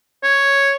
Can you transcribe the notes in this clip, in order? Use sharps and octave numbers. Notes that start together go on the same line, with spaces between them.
C#5